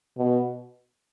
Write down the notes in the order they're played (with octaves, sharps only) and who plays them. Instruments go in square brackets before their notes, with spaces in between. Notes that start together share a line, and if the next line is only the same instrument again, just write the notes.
[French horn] B2